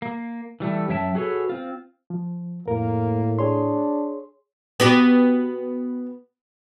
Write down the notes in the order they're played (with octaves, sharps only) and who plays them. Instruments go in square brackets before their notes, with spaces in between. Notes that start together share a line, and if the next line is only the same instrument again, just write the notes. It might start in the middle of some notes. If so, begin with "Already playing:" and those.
[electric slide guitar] A#3
E3 G3 A3
F#2 F#3 C#5 E5 G5 A5
F#4 G#4 A4 B4 C#5
C4 F4
[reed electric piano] F3
[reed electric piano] F2 A#4 [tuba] A2 [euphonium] A#3
[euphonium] D4 [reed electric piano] G#4 C#5 C6
[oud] B3 F#4 G4